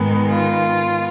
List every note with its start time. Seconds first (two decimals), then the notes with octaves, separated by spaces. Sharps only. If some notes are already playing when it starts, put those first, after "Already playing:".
Already playing: G#2 D#3 G#3 B3
0.28 F4